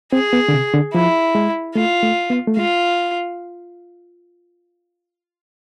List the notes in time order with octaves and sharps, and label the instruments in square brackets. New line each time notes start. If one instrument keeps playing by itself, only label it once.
[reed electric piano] C4 [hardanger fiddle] G#4
[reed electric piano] B3
D3
C3
D3
[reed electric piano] F3 [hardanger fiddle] E4
[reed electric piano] G#3
[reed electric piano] A3 [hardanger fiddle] F4
[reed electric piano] A3
B3
A3
[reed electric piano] G#3 [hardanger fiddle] F4